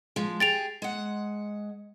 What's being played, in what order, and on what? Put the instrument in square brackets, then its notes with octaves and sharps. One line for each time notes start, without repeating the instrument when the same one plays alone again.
[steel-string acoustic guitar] F3 G#3
[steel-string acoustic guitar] G4 G#4 [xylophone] A6 D7 F7
[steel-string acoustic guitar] G#3 F#5